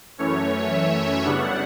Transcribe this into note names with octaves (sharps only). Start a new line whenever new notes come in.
F#2 E3 A3 C#4 C#5
E5
F#2 C#3 G3 B3 D4 F#5